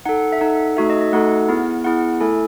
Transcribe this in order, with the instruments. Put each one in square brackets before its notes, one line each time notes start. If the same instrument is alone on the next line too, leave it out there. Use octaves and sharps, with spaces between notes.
[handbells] D#4 A4 F#5
E5
D#4 A4 F#5
A3 D#4 F#4 A4 E5
D#5
D#5
A3 D#4 F#4 A4 F#5
B3 E4 G#4
B3 E4 G#4 F#5
A3 E4 A4 G#5